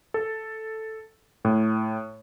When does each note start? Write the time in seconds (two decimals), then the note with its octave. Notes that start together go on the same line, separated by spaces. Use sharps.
0.14 A4
1.45 A2